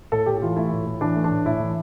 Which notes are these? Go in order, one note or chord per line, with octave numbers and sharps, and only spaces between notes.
A2 A4
A2 G4
G4
E3 F4
A3 E4
A2
A2
E3 D4
A3
D4
A2
A2 E4
E3